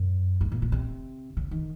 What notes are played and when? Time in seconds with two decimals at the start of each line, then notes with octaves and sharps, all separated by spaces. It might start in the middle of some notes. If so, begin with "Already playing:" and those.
Already playing: F#2
0.41 G#2
0.52 A#2
0.62 A#2
0.72 C3
1.37 C#3
1.51 D#3